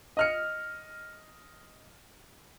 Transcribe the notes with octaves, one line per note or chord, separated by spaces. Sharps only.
D#5 F6 C#7